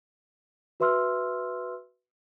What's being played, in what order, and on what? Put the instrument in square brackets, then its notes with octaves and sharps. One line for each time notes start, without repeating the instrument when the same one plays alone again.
[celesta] F#4 B4 E5 C6 E6 F6